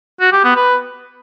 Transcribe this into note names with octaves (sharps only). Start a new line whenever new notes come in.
F#4
G4
B3
B4